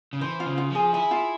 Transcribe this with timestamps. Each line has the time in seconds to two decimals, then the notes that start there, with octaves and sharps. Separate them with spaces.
0.13 C#3
0.21 E3 C5
0.40 F4
0.45 C#3
0.58 F4
0.70 F3
0.75 G#4
0.93 E4 G#4
1.11 F4